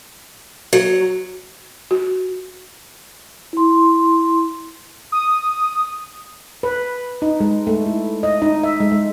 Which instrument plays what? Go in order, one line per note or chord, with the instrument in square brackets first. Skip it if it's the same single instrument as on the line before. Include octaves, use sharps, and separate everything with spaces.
[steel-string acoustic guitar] F#3
[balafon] F#4
[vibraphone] E4 C6
[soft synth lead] D#6
[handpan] B4
D#4
G#3
A3
E4
D#5
D#4
E5
G#3
G#3